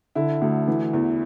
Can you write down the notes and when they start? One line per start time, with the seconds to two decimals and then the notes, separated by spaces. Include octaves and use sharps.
0.15 D3 E4
0.41 D2
0.67 E3
0.93 E2